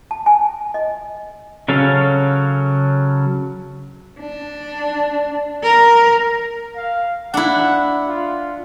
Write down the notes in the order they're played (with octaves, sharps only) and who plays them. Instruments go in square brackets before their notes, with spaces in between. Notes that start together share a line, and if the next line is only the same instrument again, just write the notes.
[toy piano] A5
G#5
D#5
[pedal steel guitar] C#3 F#3 C#4 A4 F5
[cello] D4
A#4
[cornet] F5
[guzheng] D4 E4 [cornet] F#5
[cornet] F4